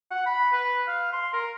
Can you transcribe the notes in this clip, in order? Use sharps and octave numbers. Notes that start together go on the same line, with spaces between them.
F#5
B5
B4
F5
C6
A#4